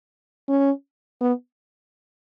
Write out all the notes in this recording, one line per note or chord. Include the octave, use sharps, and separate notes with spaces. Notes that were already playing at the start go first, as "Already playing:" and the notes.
C#4
B3